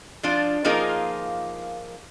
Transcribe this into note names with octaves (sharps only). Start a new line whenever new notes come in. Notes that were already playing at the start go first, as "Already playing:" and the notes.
F3 D4 F4
F3 A#3 D#4 F4 G#4 A#4